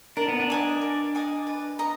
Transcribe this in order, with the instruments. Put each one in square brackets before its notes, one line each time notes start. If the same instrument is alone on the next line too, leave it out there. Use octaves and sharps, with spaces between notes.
[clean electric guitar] D4 [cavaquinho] A#4
[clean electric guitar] B3
D4
[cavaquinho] D#5 G#5 D6
A#4
D#5 G#5 D6
B4
D#5 A#5